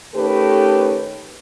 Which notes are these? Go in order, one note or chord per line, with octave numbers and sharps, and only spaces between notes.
D#3 A3 C#4 G4 A4 B4